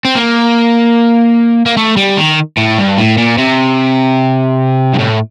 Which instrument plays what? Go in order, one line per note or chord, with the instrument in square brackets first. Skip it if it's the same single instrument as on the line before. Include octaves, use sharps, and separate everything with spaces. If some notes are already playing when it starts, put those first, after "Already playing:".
[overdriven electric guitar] C4
A#3
A#3
A3
G3
D#3
A2
G2
A2
A#2
C3
G2
A2